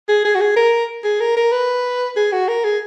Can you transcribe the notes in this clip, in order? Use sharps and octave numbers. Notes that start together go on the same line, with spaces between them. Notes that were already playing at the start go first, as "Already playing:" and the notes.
G#4
G#4
F#4
G#4
A#4
G#4
A#4
A#4
B4
G#4
F#4
A#4
G#4